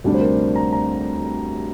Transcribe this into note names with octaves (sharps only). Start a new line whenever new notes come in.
D2 C3 G3 D4
C5
A#4
A#5
A#5